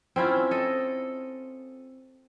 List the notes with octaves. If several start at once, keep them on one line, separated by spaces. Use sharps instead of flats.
C4 C#4 E4 F4
A4 D#5